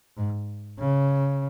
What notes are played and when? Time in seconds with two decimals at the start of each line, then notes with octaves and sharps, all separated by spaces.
0.17 G#2
0.79 C#3